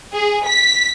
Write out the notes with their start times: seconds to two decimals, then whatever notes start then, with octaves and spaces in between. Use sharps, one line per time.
0.13 G#4
0.45 B6